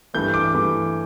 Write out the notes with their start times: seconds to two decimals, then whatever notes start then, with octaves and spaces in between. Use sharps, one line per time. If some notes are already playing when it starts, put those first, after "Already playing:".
0.14 G2 E3 A3 G6
0.34 D6
0.53 G2 E3 A3